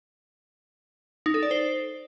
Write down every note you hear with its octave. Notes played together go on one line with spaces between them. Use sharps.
D#4
A4
D5
C5